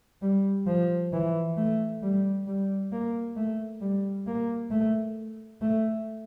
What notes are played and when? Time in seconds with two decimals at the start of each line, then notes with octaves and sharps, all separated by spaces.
0.22 G3
0.67 F3
1.13 E3
1.57 A3
2.03 G3
2.47 G3
2.92 A#3
3.36 A3
3.81 G3
4.27 A#3
4.71 A3
5.61 A3